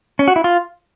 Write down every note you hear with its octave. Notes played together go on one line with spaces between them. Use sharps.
C#4
F#4
E4
F4